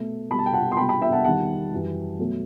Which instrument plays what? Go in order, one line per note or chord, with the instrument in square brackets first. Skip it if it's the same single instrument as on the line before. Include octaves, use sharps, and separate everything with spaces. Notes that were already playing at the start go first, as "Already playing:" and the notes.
Already playing: [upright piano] B2 A3
B2 G3 B5
A5
G5
F#5 A5
C6
B2 G5 B5
G3
G5 B5
E5 G5
F#5 A5
E2 D#3 G3 F#5 A5
F#2 E3 G3
B2 F#3 A3